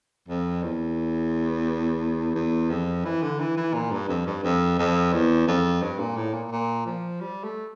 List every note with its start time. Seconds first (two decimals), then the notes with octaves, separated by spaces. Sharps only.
0.28 F2
0.63 E2
2.35 E2
2.70 F2
3.05 E3
3.22 D3
3.39 E3
3.57 E3
3.74 A#2
3.91 G2
4.08 F2
4.26 G2
4.43 F2
4.78 F2
5.13 E2
5.47 F2
5.82 G2
5.99 A#2
6.16 A2
6.33 A#2
6.52 A#2
6.86 F3
7.21 G3
7.44 A3